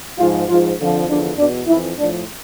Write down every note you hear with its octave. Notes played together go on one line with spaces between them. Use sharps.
G#2 F3 F4
G#2 F3 F4
F2 D3 F3
E2 D3 F3 D4
E2 B2 D4
F2 E3 E4
A2 F3 D4